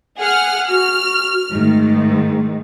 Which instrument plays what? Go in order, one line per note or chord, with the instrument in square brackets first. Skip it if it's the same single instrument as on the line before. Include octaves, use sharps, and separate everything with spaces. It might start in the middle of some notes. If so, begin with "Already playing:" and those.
[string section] G#4 F#5 F6
[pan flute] F#4 [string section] F6
[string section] G#2 D#3 [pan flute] A3